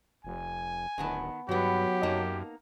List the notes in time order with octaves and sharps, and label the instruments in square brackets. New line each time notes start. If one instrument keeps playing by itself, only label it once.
[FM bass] F1 [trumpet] G#5
[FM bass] D1 [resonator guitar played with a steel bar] D#3 B3 A5
[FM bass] G2 [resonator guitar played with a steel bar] D#3 B3 [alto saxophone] F#3 [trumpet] G4
[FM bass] F#2 [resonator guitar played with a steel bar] A#3 D#4 A5